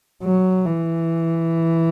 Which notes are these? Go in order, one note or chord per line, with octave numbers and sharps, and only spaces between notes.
F#3
E3